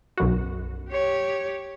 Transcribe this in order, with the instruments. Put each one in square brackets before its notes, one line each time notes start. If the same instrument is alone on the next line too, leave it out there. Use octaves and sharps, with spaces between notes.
[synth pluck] B1 F#2 F#4
[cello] G4 C#5